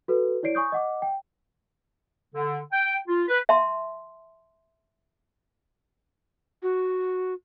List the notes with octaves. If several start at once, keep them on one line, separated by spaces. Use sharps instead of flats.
F#4 A4 B4
E4 C#5 D5 C7 D7
G#5 C#6 D#6 G6
D#5 F#5 D6
G5
D3
G5
F4
B4
E5 A5 C6
F#4